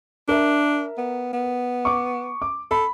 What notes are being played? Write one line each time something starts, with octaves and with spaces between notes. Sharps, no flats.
D4 A#4 E5
B3
B3
C#6 D6
D6
A4 B5